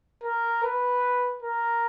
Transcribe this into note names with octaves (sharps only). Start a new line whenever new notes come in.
A#4
B4
A#4